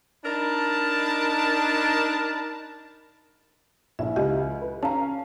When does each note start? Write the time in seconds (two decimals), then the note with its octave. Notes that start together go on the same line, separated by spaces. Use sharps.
0.25 D4 D#4 A#4 A5 B5
3.99 A#1 E4 E5
4.16 C#2 E4 G4 D#5
4.62 B4
4.83 C#4 F5 A5 A#5